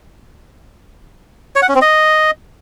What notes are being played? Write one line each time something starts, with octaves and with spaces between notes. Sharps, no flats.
C#5
F#5
C#4
C4
D#5